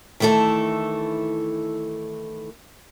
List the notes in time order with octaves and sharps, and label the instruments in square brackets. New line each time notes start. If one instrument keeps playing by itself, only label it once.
[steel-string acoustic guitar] D#3 E3 A3 E4 A4